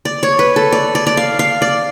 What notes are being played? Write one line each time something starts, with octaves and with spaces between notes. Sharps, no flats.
D5
C#5
B4
A4
D5
D5
D5
F5
F5
D5